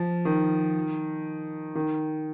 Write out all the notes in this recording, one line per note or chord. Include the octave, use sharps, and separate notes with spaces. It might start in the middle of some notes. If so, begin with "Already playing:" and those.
Already playing: F3
D#3
D#3